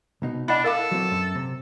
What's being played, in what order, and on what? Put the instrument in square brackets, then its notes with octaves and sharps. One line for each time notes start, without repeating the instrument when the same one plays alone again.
[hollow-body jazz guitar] C2 B2 D#4
[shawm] D4 [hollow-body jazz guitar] E4 [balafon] D#5 F#5 B5
[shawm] A4 [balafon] A#4 F5 D6
[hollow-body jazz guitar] F#3 C4
F#2
C3